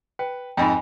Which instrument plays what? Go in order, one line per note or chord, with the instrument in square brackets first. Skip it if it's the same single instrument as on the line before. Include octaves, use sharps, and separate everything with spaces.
[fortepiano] B4 [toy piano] G5
[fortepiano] F2 G#2 [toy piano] G5 G#5 B5